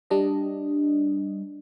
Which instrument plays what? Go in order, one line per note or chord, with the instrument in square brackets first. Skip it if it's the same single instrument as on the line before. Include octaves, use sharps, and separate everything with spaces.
[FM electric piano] G3 D4 D#5